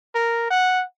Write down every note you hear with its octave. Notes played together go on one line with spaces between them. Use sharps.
A#4
F#5